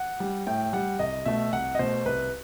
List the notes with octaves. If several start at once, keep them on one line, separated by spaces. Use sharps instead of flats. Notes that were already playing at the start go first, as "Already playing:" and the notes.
Already playing: F#5
G3
A2 G5
G3 F#5
C2 D#5
B2 A3 E5
C2 F#5
D#5
B2 A3 C5
C2 B4